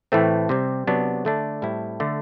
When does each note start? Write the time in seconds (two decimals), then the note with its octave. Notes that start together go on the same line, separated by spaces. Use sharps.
0.12 A2 E3 A3 C4
0.49 C3 G3 C4
0.87 C3 F#3 B3 D4
1.25 D3 A3 D4
1.62 A2 G3 C4 E4
2.00 D3 A3